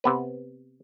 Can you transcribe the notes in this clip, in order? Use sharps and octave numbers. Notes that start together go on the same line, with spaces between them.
C3 B3 B4